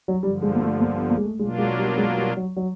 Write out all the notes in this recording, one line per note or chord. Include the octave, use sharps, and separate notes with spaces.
F#3
G2 D3 F3 G3
G#3
A#3
A3
A#3
B3
A#3
G#3
A3
B2 F#3 G#3 A#3 D4 F4
G#3
G3
G#3
G3
F#3
F#3